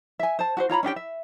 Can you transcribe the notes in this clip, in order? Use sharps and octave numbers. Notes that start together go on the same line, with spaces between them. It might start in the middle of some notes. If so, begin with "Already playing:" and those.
E5 G#5
C5 A5
F#4 G4 C5
F4 C#5 A#5 B5
C#4 D4 G4 G5
E5